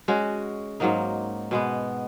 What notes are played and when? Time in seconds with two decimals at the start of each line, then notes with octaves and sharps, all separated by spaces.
0.08 G#3 C#4 F#4
0.80 G#2 F#3 A#3 D#4
1.51 B2 G#3 B3